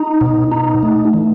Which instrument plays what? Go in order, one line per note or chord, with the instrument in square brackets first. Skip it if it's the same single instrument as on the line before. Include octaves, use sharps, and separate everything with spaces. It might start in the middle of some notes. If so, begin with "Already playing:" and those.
Already playing: [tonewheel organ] D#4
B2
D#4
A3
E3